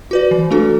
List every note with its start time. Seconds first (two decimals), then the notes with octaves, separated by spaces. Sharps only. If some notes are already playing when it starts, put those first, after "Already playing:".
0.11 F#4 B4 D5
0.31 E3
0.51 A3 D4 F#4 A4